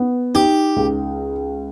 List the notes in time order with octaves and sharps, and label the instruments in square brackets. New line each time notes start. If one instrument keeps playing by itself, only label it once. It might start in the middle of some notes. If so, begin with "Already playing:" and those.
Already playing: [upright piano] B3
[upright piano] D#4 [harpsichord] G4
[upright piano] C#2